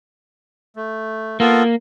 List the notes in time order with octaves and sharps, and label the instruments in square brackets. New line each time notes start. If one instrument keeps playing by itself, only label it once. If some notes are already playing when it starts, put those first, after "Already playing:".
[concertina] A3
[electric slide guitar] A#3 [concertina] B3 F4 A4